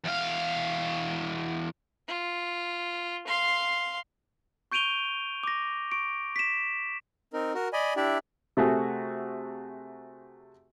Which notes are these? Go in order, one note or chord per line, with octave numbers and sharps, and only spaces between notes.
E2 F5
F4
F5 C6
C#6 G6 D7 D#7 F7 G7
D6 A#6
C#6 D7
B6 E7
C4 D#4 A#4
F#4 A#4
D5 D#5 G#5 B5
D4 E4 G4 D5 E5
C3 A3 F#4 G#4